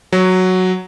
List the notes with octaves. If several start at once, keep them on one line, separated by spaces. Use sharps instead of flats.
F#3